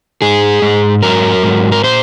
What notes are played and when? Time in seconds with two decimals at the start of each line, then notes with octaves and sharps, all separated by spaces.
0.22 G#2 G#4
0.62 G#2
1.02 F#3 A#4
1.43 G#2
1.72 A#4
1.84 A#2 C5